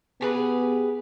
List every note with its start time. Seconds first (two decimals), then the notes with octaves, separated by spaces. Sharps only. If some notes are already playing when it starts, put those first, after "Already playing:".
0.21 B3 G4 G#4 B4